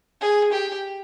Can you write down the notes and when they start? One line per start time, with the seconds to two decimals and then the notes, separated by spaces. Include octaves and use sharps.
0.21 G#4
0.52 G4